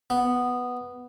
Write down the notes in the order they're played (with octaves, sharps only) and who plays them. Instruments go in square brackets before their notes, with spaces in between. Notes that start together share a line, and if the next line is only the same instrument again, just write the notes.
[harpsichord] B3